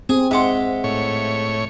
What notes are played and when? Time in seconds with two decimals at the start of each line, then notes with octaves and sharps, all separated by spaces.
0.09 C4 G#4 G#5
0.31 G#2 E5 F#5 C6 D6
0.84 A2 C#5